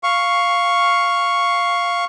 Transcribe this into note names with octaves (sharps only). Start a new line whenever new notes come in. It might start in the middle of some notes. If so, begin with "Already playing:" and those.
F5 C#6